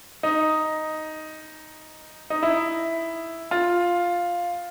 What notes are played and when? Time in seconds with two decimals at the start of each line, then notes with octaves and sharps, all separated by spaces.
0.23 D#4
2.30 D#4
2.43 E4
3.51 F4